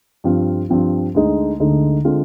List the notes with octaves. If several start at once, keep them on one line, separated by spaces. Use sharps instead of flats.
G2 F3 C4 F4
G2 F3 C4 F4
D2 D3 G#3 D#4
D2 D3 G#3 D#4
D3 G#3 C4 F4